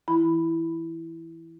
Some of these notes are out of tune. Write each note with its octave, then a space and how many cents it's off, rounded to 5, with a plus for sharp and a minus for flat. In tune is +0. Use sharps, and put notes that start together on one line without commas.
E3 -5 E4 +0 B5 +0